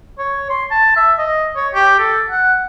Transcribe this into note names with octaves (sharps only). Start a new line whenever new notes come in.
C#5
C6
A5
E5
D#5
C#5
G4
A4
F#5